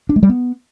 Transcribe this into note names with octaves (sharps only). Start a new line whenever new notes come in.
D4
G#3
G3
B3